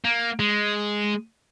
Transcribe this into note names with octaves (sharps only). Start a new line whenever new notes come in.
A#3
G#3